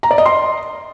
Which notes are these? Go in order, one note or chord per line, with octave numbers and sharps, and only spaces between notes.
A#5
D5
D#5
C6